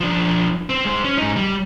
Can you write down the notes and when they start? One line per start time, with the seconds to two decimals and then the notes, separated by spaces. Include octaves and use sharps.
0.01 F3 D4
0.70 C4
0.85 G#3 C5
1.04 C#4
1.18 G#2 D#4
1.37 G3